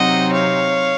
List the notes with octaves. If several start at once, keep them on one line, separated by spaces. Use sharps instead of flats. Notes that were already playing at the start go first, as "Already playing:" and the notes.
Already playing: C3 F#3 C4 D#4 D#5 F#5
C#5 F5